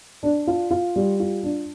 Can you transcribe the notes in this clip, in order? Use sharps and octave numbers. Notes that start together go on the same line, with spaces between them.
D4
F4
F4
G3
F4
D4